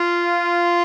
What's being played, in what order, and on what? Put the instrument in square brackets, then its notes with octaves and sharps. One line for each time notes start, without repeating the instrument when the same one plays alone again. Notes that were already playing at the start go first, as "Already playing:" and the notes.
Already playing: [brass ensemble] F4